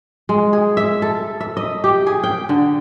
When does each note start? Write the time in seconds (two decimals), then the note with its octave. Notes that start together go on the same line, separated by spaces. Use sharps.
0.29 G#3
0.53 G#4
0.77 E5
1.02 A4
1.40 E5
1.57 D#5
1.84 G4
2.07 G#4
2.23 G5
2.49 D3